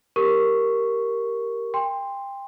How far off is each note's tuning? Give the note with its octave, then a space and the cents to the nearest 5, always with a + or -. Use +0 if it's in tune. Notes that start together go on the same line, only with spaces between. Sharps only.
G4 +0 A#4 +0 C#6 +0
G5 +30 C6 +0